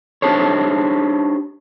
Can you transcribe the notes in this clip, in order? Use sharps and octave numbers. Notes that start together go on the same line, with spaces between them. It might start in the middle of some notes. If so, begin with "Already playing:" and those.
D4 D#4 G4 A4 C5 C#5